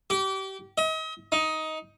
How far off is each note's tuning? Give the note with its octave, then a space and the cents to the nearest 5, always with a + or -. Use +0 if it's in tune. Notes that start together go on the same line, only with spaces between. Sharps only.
G4 -30
D#5 +40
D#4 +15